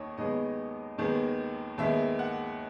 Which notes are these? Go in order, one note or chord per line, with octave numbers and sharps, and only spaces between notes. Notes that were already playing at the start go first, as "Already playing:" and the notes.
Already playing: D#2 D#3 C#5 D#5
D#2 D#3 G#3 B3 D#5
D#2 D#3 G#3 B3
D#2 D#3 G#3 B3 E5
F#5